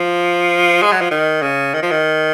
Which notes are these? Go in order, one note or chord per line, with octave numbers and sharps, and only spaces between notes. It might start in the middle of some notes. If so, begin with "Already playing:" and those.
Already playing: F3
G#3
F#3
F3
D#3
C#3
D#3
F3
D#3